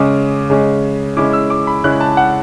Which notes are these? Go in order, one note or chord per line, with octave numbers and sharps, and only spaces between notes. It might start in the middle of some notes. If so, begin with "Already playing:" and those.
Already playing: C#3 G#3 C#4 D6
C#3 G#3 C#4
C#3 G#3 C#4 E4 D6
E6
D6
B5
C#3 G#3 C#4 E4 F#6
A5
F#5